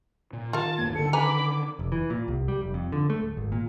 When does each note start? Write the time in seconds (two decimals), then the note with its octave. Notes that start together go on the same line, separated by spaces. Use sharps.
0.33 A#2
0.53 D#3 F4 A#4 A5
0.78 D1 G2 A#3 G#6
0.95 D3 D#3 A4 C#7
1.13 B4 G#5 A#5 B5 D6
1.79 F1
1.92 E3
2.10 A#2
2.28 C2
2.48 G3
2.61 F1
2.74 F2
2.92 D3
3.10 A3
3.22 D1
3.37 G#1
3.52 A#2